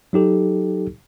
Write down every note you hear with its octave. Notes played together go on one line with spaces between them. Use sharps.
F#3 D#4 G4 A4